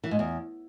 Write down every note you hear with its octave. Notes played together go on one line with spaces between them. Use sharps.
E3
G#2
E2